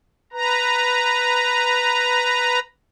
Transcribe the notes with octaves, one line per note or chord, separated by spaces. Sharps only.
B4 A#5